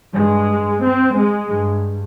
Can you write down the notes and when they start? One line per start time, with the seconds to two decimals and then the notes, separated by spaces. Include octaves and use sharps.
0.13 G2 G#3
0.82 C4
1.16 G#3
1.50 G2